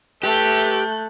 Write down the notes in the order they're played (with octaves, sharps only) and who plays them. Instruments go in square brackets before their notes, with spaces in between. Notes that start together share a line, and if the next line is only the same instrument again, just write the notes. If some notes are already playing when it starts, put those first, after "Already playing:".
[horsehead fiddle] A3 [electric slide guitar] G4 [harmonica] A4 B4 E5 [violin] F#6 G6